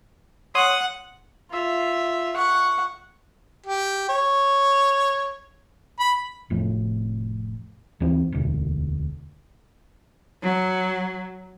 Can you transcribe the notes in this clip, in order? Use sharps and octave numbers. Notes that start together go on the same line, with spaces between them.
C#5 F#5 C6 D#6
F4 E5
F#5 C#6
G4
C#5
B5
F1 F2 A2
D#2 E3 C4
E1 D2 B2
F#3